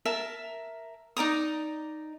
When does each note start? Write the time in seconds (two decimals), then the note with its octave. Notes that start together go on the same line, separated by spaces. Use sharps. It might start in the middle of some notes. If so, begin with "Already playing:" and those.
0.05 A#4 E5 A5
1.17 D#4 D5 A#5 D#6